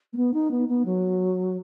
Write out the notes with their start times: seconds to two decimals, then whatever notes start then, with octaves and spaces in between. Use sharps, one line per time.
0.13 A#3
0.17 B3
0.34 D#4
0.51 B3
0.69 B3
0.85 F#3